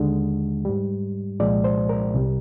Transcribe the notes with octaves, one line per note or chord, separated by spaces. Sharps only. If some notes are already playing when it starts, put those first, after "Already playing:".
Already playing: D#2 D3 G#3
G#2 G3
C2 A#2 F3 G#3 D5
C5
A#4
C2 C3 G3